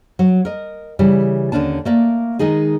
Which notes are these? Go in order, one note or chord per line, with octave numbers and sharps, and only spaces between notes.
F#3
A#4 D#5
C#3 E3 G3
D#2 D3 C#4 D4 A5
A3 A#3 D5
D#3 G#3 D#4 G#4